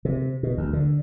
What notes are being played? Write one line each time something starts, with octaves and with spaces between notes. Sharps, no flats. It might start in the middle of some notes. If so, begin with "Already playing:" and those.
C3
B2
D2
D3